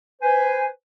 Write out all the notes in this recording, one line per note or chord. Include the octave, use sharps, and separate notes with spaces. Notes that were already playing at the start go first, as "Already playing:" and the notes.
B4 C5 G#5